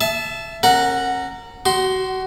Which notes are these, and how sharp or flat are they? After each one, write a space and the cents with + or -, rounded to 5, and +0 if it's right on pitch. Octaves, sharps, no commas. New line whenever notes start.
E5 +20 A5 -20
C#4 -35 A#4 -10 F#5 +0
F#4 +25 C6 +0